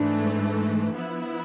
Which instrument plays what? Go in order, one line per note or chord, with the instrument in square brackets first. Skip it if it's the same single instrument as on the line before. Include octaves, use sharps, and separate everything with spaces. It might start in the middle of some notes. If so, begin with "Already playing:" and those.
Already playing: [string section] G#2 E3 A3 [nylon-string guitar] D4
[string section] F3 B3 E4